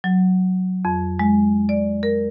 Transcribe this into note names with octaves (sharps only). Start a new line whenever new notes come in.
F#3
F2
G#3
D5
A#4